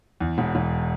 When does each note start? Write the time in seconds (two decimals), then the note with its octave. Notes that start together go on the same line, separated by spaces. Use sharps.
0.21 E2
0.38 E1
0.55 E1